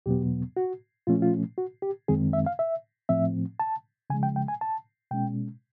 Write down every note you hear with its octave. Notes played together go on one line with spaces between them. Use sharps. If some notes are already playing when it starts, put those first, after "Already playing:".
E2 B2 F#3 B3 G4
F#4
A#2 F3 A3 C#4 F4
F4
F#4
G4
F#2 D#3 G#3 C4 G#4
E5
F5
E5
A2 F3 A3 C4 E5
A5
C#3 F3 G#3 G#5
G5
G5
G#5
A5
B2 G#3 C#4 G5